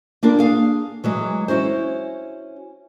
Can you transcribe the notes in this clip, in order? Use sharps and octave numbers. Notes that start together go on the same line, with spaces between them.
A#3 D4 F4 A#4
G#4 F5
E3 F#3 G#3
C#4 E4 F#4 C5